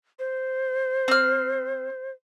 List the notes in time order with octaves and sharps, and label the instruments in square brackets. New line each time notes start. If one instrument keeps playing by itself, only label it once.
[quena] C5
[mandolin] C4 F6